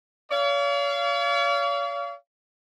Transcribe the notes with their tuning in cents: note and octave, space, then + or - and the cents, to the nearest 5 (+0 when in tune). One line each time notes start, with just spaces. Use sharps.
C#5 +45 F5 -20